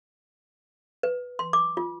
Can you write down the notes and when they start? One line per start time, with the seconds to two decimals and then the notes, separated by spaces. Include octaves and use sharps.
1.03 B4
1.39 C6
1.53 D6
1.77 F4